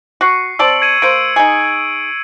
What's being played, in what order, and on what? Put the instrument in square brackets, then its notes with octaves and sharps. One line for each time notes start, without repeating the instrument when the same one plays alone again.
[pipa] F#4 [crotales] C#6 C7 C#7
[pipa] C4 D5 A5 [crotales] E6 D7 F#7
[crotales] G#6 C#7 D#7
[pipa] A#3 C5 [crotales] D7
[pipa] D#4 G#4